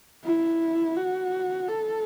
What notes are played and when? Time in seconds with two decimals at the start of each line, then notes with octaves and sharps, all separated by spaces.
0.24 E4
0.96 F#4
1.69 A4